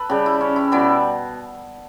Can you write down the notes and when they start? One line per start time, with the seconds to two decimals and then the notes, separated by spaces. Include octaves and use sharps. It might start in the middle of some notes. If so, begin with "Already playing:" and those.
Already playing: A4 B4
0.10 C#3 G3 G4
0.26 E4
0.41 C#4
0.56 E4
0.72 B2 G3 E4